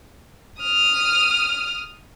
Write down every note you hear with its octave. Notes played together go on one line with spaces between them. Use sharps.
D#6 F6